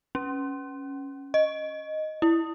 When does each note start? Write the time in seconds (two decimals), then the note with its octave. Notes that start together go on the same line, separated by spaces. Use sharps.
0.15 C#4
1.34 D#5
2.22 E4